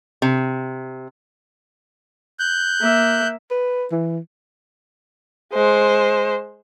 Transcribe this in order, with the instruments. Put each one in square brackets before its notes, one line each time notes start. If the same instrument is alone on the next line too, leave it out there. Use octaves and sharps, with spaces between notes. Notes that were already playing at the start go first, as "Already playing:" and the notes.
[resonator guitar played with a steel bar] C3
[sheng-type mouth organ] F#6 G6
[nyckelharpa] A#3 E5
[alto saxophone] B4
E3
[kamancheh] G#3 C5